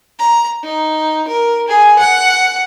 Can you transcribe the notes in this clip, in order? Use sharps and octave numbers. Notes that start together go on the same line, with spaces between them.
A#5
D#4
A#4
G#4
F#5